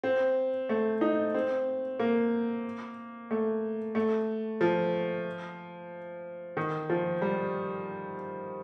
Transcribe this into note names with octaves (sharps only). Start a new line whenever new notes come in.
C4
A3
D#4
C4
A#3
A3
A3
F3
D#3
F3
G3